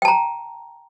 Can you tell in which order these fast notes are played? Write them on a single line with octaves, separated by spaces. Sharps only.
G5 A5 A#5